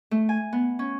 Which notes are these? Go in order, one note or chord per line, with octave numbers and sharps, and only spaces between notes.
A3
G#5
B3
C#4